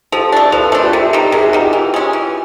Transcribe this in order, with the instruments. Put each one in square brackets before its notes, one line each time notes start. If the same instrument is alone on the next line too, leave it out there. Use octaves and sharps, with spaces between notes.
[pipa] F3 [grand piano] G4 A4
[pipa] A3 D4
[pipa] F3 [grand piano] A4 B4
[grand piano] A4 B4
[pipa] A3 D4 [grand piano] A#4 C5
[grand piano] F4 G4
[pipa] C3 [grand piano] G4 A4
[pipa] D#3 G3
[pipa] C3 [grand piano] G#4 A#4
[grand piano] F#4 G#4
[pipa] D#3 G3
[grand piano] F4 G4
[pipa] E3
G#3 C#4
E3